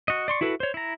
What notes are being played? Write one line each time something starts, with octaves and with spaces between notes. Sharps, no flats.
F#4 D#5
D5 C6 C#6
E4 F#4 A4 B4
C5 C#5
E4 A#5